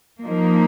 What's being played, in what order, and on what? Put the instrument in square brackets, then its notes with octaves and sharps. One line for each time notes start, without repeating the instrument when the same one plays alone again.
[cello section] F3 A#3 D#4